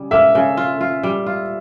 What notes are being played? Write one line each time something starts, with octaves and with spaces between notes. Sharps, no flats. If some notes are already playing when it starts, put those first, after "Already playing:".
Already playing: C#3 G3
A#3 E5
C#3
F4
F4
G3
F4